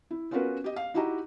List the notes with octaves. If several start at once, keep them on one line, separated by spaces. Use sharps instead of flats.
E4
B3 C#4 F4 F#4 A#4 B4
G4 D#5
F5
D#4 E4 F#4 G4 D#5 A#5